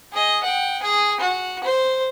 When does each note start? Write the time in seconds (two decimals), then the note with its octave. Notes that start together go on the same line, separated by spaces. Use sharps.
0.12 G#4 D#5
0.44 F#5 G5
0.83 G#4 G#5
1.20 F#4
1.64 C5